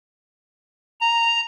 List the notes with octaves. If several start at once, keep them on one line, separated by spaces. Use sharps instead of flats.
A#5